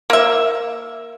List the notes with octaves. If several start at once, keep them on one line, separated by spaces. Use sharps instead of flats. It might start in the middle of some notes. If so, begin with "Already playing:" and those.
A#3 E5